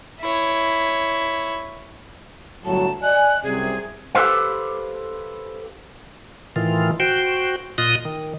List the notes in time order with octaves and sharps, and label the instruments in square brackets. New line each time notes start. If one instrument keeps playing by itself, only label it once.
[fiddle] E4 C#5
[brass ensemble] G1 A2 F#3 [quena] A5
[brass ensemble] D5 D#5 G#5 [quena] F#6
[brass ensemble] C2 F#2 C3 [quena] G#4
[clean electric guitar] G4 A4 B4 C5 F5
[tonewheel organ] A2 D#3 E3 F4
F#4 C5 G5
A#2 F4 D#5 D#6 F#6
D#3